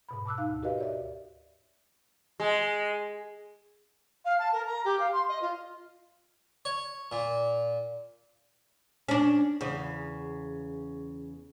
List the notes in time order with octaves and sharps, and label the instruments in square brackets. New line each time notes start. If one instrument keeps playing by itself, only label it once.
[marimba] G#2 B2 B5
A5 D6 E6 F#6
D#4 F5
D2
F#4 G4 A#4 B4 D#5 F5
C#5 D5 E5
[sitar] G#3
[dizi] F5
A5
A#4
A#5
G4
F5
C6
D#5
F4
[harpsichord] C#5
A#2
[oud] C#4 D4
E2 C#3